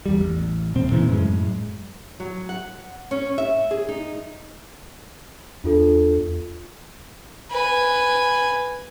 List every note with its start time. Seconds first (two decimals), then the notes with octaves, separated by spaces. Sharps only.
0.06 E2 G3
0.20 A1
0.74 D#1 B2 C4
0.90 E2 A#2 C#3 E3
1.09 F#2 A2 G#3
2.20 F#3
2.49 F#5
3.11 C#4
3.38 E5
3.71 G#4
3.89 D#4
5.64 E2 D4 F4 A4
7.51 B4 G#5